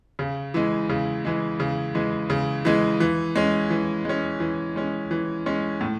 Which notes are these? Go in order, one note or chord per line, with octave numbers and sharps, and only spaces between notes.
C#3
E3 G#3
C#3
E3 G#3
C#3
E3 G#3
C#3
E3 G#3
E3
G#3 C#4
E3
G#3 C#4
E3
G#3 C#4
E3
G#3 C#4
A2